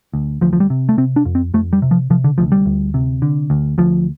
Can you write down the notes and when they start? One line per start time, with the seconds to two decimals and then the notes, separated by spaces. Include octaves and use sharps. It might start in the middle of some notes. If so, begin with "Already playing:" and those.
0.14 D2
0.41 D2 F3
0.53 F3
0.60 G3
0.70 C3
0.89 A3
0.97 C3 C4
1.16 D4
1.25 F2
1.35 C4
1.54 F2 A3
1.73 G3
1.82 C3
1.91 F3
2.10 C3 F3
2.24 D3
2.38 D2 F3
2.52 G3
2.66 D2
2.94 C3
3.22 D3
3.50 D2
3.78 D2 F3